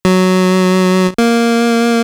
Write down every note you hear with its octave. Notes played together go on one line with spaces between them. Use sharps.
F#3
A#3